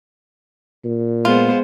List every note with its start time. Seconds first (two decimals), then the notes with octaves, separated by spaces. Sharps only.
0.84 A#2
1.25 G#3 B3 F4 C5